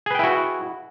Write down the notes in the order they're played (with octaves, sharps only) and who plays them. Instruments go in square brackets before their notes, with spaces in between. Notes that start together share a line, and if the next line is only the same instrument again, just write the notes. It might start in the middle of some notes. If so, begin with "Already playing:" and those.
[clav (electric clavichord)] G#4
B4
G5
E4
F#4